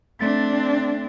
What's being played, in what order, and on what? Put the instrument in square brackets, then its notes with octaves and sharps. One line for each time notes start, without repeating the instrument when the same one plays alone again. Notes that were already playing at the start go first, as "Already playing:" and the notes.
[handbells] A3 A6 B6 [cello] C4 D4